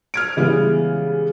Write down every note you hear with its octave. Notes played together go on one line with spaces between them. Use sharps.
F6 G#6 D7
C#3 E3 G3 G#3 B3